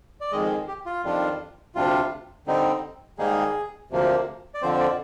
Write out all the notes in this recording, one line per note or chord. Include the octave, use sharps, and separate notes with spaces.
D5
F2 D#3 G#3 D#5
G#4
G4
F4
F2 D#3 G3 D4 F4
D2 C3 G3 D4 F4
D3 G3 C4 D#4
G#2 D#3 G3 A#3 D#4 G#4
D2 C3 F3 A#3
D5
F2 D3 F3 C4 C5
D5